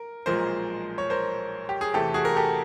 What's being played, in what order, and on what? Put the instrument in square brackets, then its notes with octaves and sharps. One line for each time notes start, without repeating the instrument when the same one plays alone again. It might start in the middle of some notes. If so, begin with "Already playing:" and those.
Already playing: [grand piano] A#4
B1 A#2 F3 G#3 A#4 C5
C#5
A#4 C5
G4
G#4
E2 C3 E3 A3 G4 A4
F#4 G#4
A#4
G4 A4